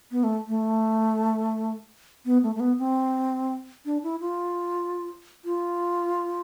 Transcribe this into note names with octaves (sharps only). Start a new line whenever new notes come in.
B3
A3
A3
B3
A3
A3
B3
C4
D4
E4
F4
F4